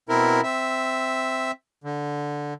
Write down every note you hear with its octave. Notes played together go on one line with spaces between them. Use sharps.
B2 C4 E4 A#4
C4 E5
D3